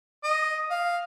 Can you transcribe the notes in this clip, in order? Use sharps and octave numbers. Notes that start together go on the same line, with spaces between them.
D#5
F5